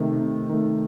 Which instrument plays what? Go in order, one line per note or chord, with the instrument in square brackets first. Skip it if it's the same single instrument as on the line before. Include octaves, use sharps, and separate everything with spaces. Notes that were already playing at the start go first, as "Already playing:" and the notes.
Already playing: [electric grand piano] C3 D#3 A3
C3
D#3 A3